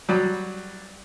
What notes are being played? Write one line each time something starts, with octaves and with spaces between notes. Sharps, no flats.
F#3 G3